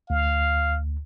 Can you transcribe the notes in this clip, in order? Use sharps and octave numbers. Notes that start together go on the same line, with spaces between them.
D2 F5